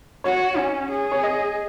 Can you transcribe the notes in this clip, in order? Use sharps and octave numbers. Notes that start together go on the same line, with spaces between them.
F#4 C#5
C#4
G#4
C#5
D#5